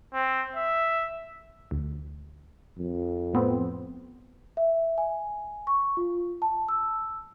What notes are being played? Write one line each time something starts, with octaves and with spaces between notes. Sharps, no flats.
C4
E5
D2
F2
A2 B3 C4
E5
G#5
C#6
F4
A5
E6